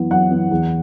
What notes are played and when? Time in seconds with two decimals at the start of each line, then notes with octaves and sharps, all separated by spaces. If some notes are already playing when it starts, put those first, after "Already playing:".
Already playing: F#2 E3 B3
0.11 F#2 F#5
0.31 E3 B3
0.51 E2